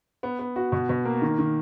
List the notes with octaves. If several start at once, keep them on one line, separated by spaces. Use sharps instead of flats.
B3
B3
F#4
B2
B2
A#3
D#3
D#3